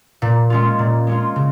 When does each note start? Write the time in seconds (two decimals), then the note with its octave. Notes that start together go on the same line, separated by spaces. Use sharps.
0.22 A#2
0.50 G#3 C#4 F4
0.79 A#2
1.07 G#3 C#4 F4
1.36 C#3